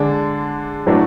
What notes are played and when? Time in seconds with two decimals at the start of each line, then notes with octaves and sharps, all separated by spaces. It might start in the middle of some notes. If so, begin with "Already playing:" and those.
Already playing: D3 G#3 D4
0.86 A2 F#3 A3 D4